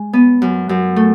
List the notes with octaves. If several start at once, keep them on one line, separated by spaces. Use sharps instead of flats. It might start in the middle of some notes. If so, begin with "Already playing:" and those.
Already playing: G#3
B3
F#2
F#2
A3